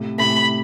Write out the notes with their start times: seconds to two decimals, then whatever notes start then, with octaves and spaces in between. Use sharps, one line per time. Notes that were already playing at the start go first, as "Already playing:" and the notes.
Already playing: A2 C3
0.18 A2 C3 B5